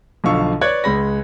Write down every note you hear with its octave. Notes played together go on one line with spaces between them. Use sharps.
B1 D3 F3 F5 C#6 E6
B4 C#5 D5 F#6 G#6
C#2 G#3 B5 A#6